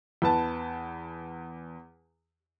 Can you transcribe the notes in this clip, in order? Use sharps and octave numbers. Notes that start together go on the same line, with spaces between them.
E2 B4 A5